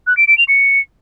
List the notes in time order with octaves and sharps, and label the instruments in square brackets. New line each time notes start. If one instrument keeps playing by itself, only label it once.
[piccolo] F#6
D7
D7
F7
C#7